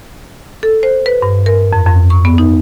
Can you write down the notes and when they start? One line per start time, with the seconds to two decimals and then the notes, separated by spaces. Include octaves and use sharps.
0.63 A4
0.83 C5
1.06 B4
1.22 G2
1.46 A#4
1.73 F2
1.86 F2
2.10 C#6
2.25 B3
2.38 D#4